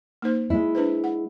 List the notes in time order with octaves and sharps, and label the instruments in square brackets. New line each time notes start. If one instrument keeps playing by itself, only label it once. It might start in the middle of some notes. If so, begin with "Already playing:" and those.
[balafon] A#3 D#4 C5
[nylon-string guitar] G#3 E4
[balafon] D4 B4 C5
F#5